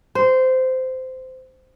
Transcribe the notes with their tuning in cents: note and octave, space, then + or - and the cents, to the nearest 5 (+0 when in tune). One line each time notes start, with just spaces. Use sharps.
C5 -15